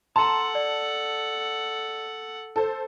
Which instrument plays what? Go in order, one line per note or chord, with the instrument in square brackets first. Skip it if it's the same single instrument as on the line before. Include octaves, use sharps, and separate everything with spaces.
[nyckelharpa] A4 F#5 [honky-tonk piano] A5 [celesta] A#5 C6
[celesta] D5
[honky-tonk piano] A4 C5